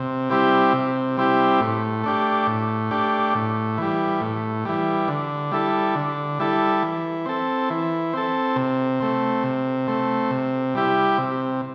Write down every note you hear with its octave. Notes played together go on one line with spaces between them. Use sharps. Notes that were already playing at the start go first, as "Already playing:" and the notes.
Already playing: C3
G3 C4 E4 G4
C3
G3 C4 E4 G4
A2
A3 D4 G4
A2
A3 D4 G4
A2
E3 G3
A2
E3 G3
D3
G3 E4 A4
D3
G3 E4 A4
E3
C4 A4
E3
C4 A4
C3
A3 C4
C3
A3 C4
C3
G3 E4 G4
C3